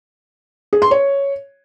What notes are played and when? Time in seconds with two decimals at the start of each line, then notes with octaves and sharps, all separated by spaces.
0.73 G#4
0.82 C6
0.91 C#5